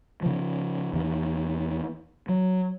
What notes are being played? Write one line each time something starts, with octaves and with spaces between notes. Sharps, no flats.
C#3 F3
E2 D#3
F#3